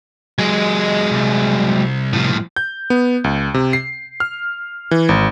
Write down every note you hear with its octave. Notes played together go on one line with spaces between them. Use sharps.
F#3 G#3 D#5 G#5
C2
A2 F3
G6
B3
C#2
C3
C7
F6
E3
G#1